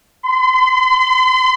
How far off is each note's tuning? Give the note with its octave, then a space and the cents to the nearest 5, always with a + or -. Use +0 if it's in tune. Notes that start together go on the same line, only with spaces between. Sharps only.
C6 -40